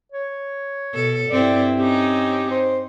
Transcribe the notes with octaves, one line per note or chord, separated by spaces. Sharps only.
C#5
B2 A4
G2 C4 E4 D5
C4 C#4 D#4 G4
C5